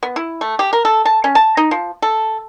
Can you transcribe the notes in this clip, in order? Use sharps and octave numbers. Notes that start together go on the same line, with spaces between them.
B3
E4
A3
G4
A#4
A4
A5
C#4
A5
D#4
F3
A4